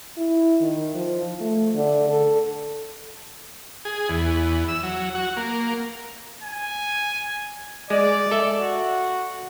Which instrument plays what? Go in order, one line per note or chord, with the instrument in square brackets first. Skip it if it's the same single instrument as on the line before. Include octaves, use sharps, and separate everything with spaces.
[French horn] E4
D#3
F3
A3
D3
A4
[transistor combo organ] G#4
E2
E6
F#3
F#4
A#3
[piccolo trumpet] G#5
[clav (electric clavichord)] G#3 [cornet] D5
[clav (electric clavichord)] A4 E5
[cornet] F#4